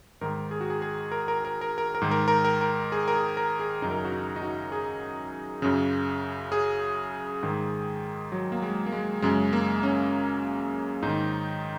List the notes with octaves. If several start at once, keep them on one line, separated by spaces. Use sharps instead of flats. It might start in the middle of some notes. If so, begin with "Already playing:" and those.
G#2 D#3 A#4
G#4
F#4
G#4
G#4
A#4
A#4
A#4
A#4
A#4
A#4
G#2 D#3
A#4
A#4
A#4
A#4
G#4
A#4
G#4
A#4
G#4
F#2 C#3 D#4
A#4
G#4
F#4
D#4
D#4
F#4
G#4
F#2 C#3
G#4
G#2 D#3
F#3
A#3
G#3
A#3
G#3
F#2 C#3 G#3
A#3
C#4
G#2 D#3 D#4